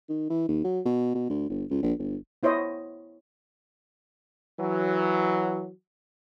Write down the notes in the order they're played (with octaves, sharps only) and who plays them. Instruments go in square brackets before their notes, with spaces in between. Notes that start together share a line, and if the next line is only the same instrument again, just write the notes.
[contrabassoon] D#3
E3
D#2
F#3
B2
B2
D2
G1
C#2
A#1
G1
[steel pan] B3 E4 C5 C#5 D#5
[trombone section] E3 F#3